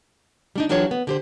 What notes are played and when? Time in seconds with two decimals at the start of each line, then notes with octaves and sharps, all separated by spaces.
0.56 G3 D4 D#4
0.69 E3 F#3 D4 F4 G4 C#5
0.91 B3
1.07 D3 G4 C5